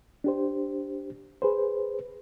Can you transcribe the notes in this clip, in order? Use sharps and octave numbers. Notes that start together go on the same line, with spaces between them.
D4 G4 C5
G#4 B4 C5